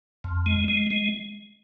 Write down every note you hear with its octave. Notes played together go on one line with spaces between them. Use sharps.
F2
G#3
G#3
G#3